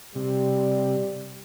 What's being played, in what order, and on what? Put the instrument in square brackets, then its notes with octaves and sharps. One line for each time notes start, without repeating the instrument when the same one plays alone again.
[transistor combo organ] C3 [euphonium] G3